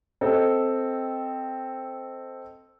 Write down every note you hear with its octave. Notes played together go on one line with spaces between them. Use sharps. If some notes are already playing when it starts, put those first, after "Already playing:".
C4 A4 D#5